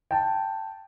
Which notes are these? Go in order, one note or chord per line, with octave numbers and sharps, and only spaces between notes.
G5 A5